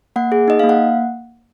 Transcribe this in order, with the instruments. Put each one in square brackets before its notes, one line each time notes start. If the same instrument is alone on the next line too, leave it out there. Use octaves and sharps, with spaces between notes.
[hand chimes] A#3 F#5
G#4
D#4 D#5
A#3 F5
F#5